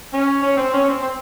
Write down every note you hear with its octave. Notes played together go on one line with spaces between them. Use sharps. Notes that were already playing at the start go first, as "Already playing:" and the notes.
C#4
C#4
C4
C#4
C4
C4